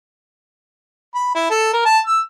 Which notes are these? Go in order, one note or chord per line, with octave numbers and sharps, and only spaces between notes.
B5
E4
A4
A#4
A5
E6